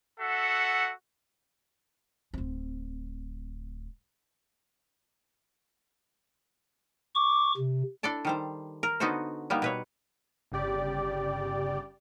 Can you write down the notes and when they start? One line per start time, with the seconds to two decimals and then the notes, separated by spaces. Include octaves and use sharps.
0.20 F#4 A4 E5 F#5
2.33 D1 C4
7.15 C#6 D6
7.57 C3
8.03 D4 E4 A4 D5 A5
8.25 D#3 G3 C5
8.83 A#4
9.00 D3 B3 D#4 F#4 A4 C5
9.50 G3 A#3 B3 D#4
9.62 B2 B4 C#5
10.52 G1 C#3 G4 D5